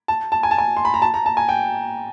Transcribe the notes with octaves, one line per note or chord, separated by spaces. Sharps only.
A5
A5
G#5
A5
G#5
C6
B5
A#5
A5
A#5
A5
G#5
G5